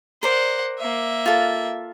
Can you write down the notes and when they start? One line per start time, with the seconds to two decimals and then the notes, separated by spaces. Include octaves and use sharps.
0.23 A#4 C5 D5 F#5
0.79 A#3 E5
1.26 F4 A4